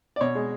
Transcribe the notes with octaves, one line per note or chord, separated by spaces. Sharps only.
D5
B2 C#5
G#3